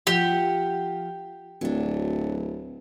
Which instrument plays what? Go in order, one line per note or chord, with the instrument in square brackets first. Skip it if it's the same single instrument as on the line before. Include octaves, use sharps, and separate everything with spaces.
[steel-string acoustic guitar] F3 F4 F#5 [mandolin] G4
[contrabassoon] D1 [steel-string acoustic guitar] F#3 D4